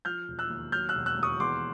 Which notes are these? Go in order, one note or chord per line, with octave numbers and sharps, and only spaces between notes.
F3 F6 G6
E1
E6 F#6
D#2
F#3 F6 G6
E6 F#6
E1
E6 F#6
D#2 C#6 D#6
E2 C6 D6